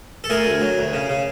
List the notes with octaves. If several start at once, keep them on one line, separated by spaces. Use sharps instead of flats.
A4
A3 G#4 A#4
D2
F#3
D2
C#3
C#3